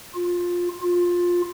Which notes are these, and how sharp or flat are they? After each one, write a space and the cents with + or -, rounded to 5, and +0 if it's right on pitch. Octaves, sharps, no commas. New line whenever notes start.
F4 +15
F4 +15